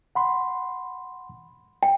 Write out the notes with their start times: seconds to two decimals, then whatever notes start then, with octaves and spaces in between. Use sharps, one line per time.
0.15 F#5 B5 C6
1.83 G5